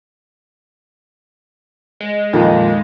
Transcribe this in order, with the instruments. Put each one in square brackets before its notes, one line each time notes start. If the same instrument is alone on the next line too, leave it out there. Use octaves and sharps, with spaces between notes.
[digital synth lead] G#3
[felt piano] F2 A#2 D#3